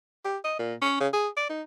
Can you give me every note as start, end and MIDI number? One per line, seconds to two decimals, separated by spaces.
0.25 0.38 67
0.44 0.54 75
0.59 0.74 46
0.82 1.00 61
1.01 1.08 49
1.13 1.28 68
1.37 1.48 74
1.49 1.62 63